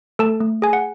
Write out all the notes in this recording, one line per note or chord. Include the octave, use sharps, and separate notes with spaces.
A3 A4 A5
A3
G#4 G#5
F#5